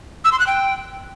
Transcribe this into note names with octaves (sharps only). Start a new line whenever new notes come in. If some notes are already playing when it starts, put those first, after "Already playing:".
E6
C6
F#6
G5